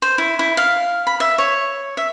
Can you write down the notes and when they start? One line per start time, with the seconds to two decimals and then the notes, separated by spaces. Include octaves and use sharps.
0.02 C5
0.18 E4
0.39 E4
0.57 F5
1.07 B5
1.20 E5
1.38 C#5
1.97 E5